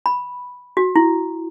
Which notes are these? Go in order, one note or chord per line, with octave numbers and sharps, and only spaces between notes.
B5
F#4
E4